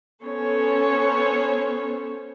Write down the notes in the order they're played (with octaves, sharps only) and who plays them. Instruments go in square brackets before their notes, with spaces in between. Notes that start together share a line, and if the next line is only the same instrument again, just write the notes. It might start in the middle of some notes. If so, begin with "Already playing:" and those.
[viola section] B3 C#4 A4 C5 C#5